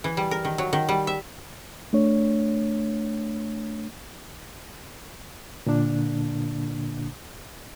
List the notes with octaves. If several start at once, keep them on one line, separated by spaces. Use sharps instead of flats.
E3
G3
A#4
D#3
F#3
D#3
G3
E5
A3 D4 C#5
A#2 D3 A#3 D4